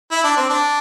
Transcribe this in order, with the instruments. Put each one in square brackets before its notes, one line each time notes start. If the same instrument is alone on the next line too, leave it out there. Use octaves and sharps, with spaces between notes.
[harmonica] E4
D4
C4
D4